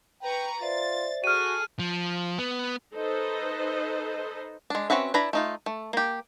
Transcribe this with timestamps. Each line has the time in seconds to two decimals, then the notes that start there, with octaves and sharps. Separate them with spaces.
0.22 B4 G5 A#5 C#6
0.61 F4 C5 D5 E5 A6
1.24 F#4 G#4 A4 F6 D#7
1.79 F3
2.38 B3
2.94 D#4 A4 B4 C5 D#5
4.70 G#3 D4
4.90 C4 C#4 F#4 B4 E5
5.14 D4 E4 B4 A#5 B5
5.33 A3 D#4 F4
5.66 A3
5.93 A#3 G4